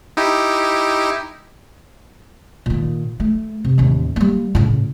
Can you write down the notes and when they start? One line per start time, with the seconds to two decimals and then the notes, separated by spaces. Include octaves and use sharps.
0.17 D#4 E4 G4
2.66 A#2 D#3
3.20 A3
3.65 C3
3.78 A1 D#2
4.16 G3 A#3
4.55 A2 C#3